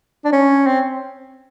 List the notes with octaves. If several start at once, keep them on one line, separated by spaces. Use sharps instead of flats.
D4
C#4
C4